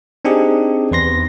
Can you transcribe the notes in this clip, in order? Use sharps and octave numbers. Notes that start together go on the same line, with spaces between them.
C4 D4 D#4 G4 G#4
E2 B4 C6 A#6